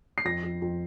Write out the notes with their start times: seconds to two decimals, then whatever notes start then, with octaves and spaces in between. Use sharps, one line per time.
0.18 C7
0.25 F2 A#6
0.43 F2
0.62 F2